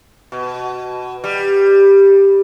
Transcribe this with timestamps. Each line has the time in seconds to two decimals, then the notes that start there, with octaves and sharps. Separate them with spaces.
0.32 B2
1.24 G3